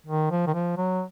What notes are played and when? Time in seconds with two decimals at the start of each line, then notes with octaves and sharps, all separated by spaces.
0.06 D#3
0.31 F3
0.47 D#3
0.54 F3
0.77 F#3